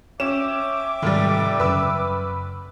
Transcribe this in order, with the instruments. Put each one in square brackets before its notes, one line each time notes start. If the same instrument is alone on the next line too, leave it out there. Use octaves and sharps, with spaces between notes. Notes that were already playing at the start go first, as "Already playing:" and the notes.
[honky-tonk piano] C#4 E7 [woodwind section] E5 G5 D6
[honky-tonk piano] F1 G3 [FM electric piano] G#2 D#3
[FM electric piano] F#2 C#3 [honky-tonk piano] B4 E6